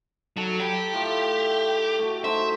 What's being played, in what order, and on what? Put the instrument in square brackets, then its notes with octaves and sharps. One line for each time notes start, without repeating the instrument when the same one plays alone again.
[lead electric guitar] F#3 [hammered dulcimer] D#4 A4
[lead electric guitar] G4 [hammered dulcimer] G5 B5
[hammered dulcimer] A2 F4 E5
A3 F#4
[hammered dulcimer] A3 D#4 C5 [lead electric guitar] E5